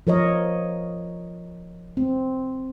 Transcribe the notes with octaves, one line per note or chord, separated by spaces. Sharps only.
F3 A#4 C#5 D#5
C4